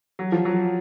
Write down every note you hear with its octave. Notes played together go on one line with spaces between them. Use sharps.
F#3
F3
F#3